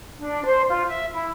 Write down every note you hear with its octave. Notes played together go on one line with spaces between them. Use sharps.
D4
C5
F4
E5
E4